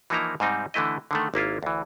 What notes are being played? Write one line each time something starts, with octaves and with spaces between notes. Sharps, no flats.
E3 F3 A#3 D#4 E4 A#5
G#2 C3 G3 C4 D#4
D3 E3 A3 E4 D#5
D3 D#3 A3
G#1 A#3 E4 F4
D2 E3